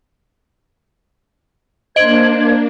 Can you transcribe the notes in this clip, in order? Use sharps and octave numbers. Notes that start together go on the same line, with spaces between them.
A#3 D4 C5 D#5 G#6 D7 F#7